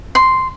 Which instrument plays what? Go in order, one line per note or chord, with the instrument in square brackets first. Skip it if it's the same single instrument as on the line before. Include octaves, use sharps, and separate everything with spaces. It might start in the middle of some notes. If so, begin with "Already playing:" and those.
[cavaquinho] C6